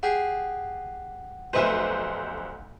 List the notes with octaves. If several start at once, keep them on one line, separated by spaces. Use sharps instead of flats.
G4 G#4 F#5
F1 B1 B4 C5 D#5 E5